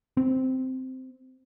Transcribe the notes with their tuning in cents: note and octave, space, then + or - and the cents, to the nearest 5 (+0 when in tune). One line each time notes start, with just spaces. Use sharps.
C4 -10